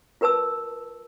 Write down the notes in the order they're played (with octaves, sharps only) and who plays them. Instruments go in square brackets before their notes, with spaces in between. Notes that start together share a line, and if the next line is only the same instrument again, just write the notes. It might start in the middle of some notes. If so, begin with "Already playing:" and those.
[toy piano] F4 A#4 B4 A5 E6